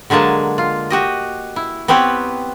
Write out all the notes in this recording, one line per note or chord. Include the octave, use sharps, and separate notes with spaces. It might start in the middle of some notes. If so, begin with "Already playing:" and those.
D3 F#3 G#3 A#3 A5
F4
F#4 G4 D#5
E4
B3 C4 G4 B4 C#5